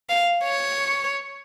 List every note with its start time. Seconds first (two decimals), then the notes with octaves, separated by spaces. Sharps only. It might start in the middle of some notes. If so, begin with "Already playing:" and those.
0.09 F5
0.44 C#5